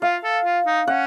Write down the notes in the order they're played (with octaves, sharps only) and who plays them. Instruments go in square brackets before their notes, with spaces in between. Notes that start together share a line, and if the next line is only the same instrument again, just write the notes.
[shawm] F4 [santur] F5
[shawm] A4
F4
D#4
[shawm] C#4 [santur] F#5